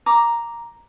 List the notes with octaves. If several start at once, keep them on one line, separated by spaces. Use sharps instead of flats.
A#5 D6